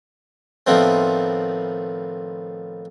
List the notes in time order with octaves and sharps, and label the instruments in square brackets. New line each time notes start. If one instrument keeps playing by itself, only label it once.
[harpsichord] A2 D#3 F3 B3 C4